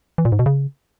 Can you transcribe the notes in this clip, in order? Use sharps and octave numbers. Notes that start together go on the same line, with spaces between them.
E3
A#2
G#2
B2
C#3